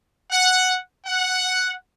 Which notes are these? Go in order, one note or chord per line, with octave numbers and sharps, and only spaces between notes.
F#5
F#5